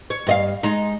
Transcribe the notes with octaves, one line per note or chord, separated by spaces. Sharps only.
C#5
G2 D#5 F5
G#3 D#4